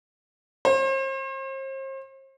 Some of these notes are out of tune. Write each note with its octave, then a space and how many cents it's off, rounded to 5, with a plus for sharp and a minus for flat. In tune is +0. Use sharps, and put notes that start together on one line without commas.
C5 +40